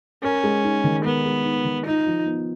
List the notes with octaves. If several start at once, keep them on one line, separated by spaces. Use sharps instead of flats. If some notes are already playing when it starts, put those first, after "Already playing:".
C#4 A#4
G#3
D#4
D#3
B3 A#4
G#3
D#4
D#3
D#4 F4
F3
B3